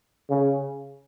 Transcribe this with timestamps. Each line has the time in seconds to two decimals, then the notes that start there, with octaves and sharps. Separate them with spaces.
0.29 C#3